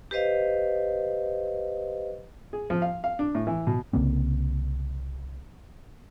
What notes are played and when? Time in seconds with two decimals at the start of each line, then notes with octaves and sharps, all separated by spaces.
0.11 G4 B4 C5 D#5 F5
2.53 G#4
2.70 F3
2.82 F5
3.04 F5
3.19 D4
3.35 A2
3.47 E3
3.67 B2
3.93 C2 C#3 A#3 C4